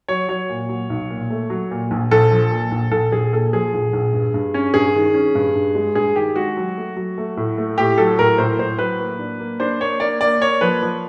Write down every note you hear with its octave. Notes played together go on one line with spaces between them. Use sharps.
F#3 C#5
F#3 C#5
A#2
F#3
B1
A#2
A3
F#3
A#2
A#1
A#1 A4
F3
A#2
A#1
A#1 A4
A#1 G#4
A#2 A4
F3 G#4
A#1
A#1
G2
G2
C#4
G2 G#4
D#3
C#4
G2
G2
G#3
G2 G#4
D#3 G4
G#3 F#4
F#3
A3
F#3
A3
A2
A3
A2 G4
F#3 A4
A2 A#4
A2 C5
A2 C5
F#3 B4
A#3
D4
A#3
D4 C5
A#3 C#5
A#3 D5
A#3 D5
A#3 C#5
F3 B4
F3